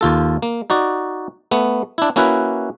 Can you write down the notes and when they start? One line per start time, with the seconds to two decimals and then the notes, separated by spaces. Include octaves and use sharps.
0.01 D#2 F4 A4
0.42 A#3
0.70 D#4 F#4 D5
1.51 A3 B3
1.98 D4 E4
2.16 A#3 C#4 E4 F#4 B4